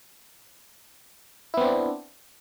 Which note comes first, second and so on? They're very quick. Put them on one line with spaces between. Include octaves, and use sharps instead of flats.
E4 B3 C4 D4